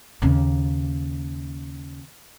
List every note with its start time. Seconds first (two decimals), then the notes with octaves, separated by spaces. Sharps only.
0.22 D#2 C#3